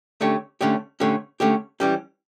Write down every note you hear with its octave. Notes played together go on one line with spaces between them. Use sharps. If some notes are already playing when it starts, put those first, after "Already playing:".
D3 A3 C#4 G4 C#5
D3 A3 C#4 G4 C#5
D3 A3 C#4 G4 C#5
D3 A3 C#4 G4 C#5
E3 G3 C#4 G4